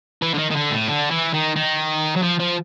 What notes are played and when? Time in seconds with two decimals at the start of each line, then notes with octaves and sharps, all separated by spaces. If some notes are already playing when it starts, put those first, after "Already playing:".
0.22 E3
0.34 D3
0.39 D#3
0.51 D#3
0.56 D3
0.72 A2
0.89 D3
1.11 E3
1.34 D#3
1.56 D#3
2.16 F#3
2.22 F3
2.39 F3